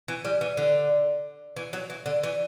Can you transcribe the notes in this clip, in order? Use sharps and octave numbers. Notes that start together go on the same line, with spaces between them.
E3
G3
E3
D3
E3
F#3
E3
D3
E3